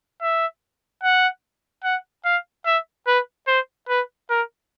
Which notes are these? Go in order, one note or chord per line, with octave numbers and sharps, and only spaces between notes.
E5
F#5
F#5
F5
E5
B4
C5
B4
A#4